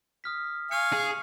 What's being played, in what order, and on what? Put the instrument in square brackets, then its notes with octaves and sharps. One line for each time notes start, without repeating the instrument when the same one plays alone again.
[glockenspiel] D#6 F6 B6
[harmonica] F5 G#5 [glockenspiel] C#6 F6 C#7
[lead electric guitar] G#4 [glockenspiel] F7